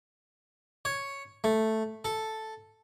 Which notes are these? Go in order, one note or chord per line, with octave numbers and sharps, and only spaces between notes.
C#5
A3
A4